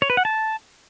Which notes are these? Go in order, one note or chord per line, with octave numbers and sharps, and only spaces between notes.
C#5
B4
F#5
A5